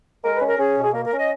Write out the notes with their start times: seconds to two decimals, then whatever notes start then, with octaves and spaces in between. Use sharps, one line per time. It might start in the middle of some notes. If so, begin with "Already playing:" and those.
0.23 G#3 A#4
0.35 B4
0.40 C#4
0.46 A#4
0.58 C#4 G#4
0.77 B2
0.84 G#4
0.94 A#3 A#4
1.05 A#4
1.12 C#4
1.18 D#5